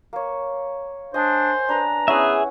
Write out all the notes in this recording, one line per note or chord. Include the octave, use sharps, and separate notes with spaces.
A#3 C#5
D4 C5 D#5 G#5
D4 B4 A#5
B3 C#4 E4 G#4 E5 F#5